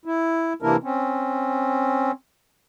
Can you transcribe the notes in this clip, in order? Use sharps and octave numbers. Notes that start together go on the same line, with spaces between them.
E4
C3 E3 A#3 D4 E4 A#4
C4 C#4